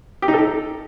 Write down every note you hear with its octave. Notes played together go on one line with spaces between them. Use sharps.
G4
D#4
A4